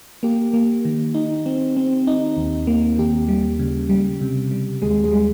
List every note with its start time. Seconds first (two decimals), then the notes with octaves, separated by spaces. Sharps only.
0.23 A#3 G4
0.53 A#3
0.85 D#3
1.14 D#4
1.46 C4
1.77 C4
2.07 D#4
2.37 D#2
2.67 A#3
2.98 D#2 G4
3.28 G3
3.59 C#3
3.89 G3
4.21 C3
4.51 G3
4.82 D#2 G#3 G#4
5.04 G#3 G#4
5.12 G3